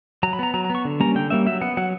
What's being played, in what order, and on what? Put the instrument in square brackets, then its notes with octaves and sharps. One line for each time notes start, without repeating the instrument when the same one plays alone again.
[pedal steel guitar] F#3 A#5
B5
B3 A#5
F#3 A#5
A#5
B3 C#6
D3
G3 A#3 C#4 A#5
D3 G5
G3 A#3 C#4 E5
F#3 E5
B3 F#5
F#3 F#5